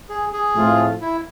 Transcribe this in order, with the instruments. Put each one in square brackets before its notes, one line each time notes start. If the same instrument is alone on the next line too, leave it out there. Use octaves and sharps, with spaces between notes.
[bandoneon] G#4
G#4
[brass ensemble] A2 F3 A3 C4 F4
[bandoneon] E4